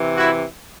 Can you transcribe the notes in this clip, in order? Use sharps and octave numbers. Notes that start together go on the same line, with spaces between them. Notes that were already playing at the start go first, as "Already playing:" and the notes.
Already playing: C3 E3
E4 F#4